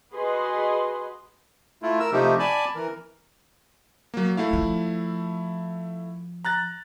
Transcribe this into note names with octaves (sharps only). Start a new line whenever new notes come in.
F#4 G#4 B4 D#5 C6
A3 E4 F4
A#4 E6
C3 F3 A3 D#4 G4
D5 G#5 A5 B5
E3 A#4
F#3 A#3
A3 E4 F5
F3
A#5 F#6 A6